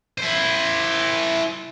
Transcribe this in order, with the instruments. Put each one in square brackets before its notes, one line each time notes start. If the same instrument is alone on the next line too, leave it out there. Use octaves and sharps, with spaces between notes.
[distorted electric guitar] E4 C5